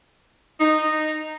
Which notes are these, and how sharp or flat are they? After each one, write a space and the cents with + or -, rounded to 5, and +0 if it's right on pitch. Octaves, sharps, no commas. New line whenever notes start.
D#4 -10